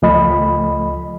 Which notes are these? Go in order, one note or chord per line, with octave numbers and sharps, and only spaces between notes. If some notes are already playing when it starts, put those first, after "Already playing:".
C#2 F3 A3 D#5 B5